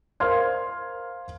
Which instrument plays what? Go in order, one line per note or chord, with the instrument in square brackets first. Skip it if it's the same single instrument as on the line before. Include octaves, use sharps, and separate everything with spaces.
[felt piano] A#4 C5 F5 C6 F6 G#6